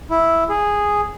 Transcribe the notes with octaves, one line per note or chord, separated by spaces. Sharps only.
E4
G#4